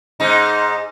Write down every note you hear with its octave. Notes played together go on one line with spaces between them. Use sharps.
G#2 D#4